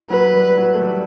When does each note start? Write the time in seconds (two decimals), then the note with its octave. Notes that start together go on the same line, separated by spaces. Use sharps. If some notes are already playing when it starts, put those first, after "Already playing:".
0.10 F#3 B4
0.34 G3
0.58 F#3
0.74 A3
0.82 G3